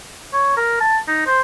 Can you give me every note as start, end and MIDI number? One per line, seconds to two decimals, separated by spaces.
0.33 0.56 73
0.57 0.78 70
0.81 0.97 81
1.08 1.25 63
1.27 1.41 72